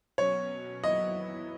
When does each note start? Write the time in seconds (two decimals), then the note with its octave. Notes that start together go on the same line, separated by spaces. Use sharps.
0.18 B2 F#3 C#4 C#5
0.84 F#3 B3 E4 D#5